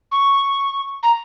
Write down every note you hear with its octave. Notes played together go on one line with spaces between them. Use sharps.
C#6
A#5